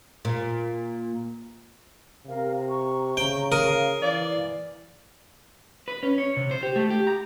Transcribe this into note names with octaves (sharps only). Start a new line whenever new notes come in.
A#2
C3 A#4 F5
A#5 C#6
C#3 G5
A#4 F5 D#6
E3 D5
B4
C#4
C#5
C3
C5
G4
A3
G4
A#5